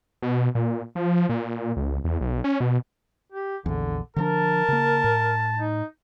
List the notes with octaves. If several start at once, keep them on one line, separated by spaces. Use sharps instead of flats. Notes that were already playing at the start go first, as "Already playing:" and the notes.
B2
A#2
F3
A#2
C#2
E2
B1
C#4
B2
G4
A#1 E2 D3
D3 F3 D4 A#4 A5
C#3 A#3
A2
D#4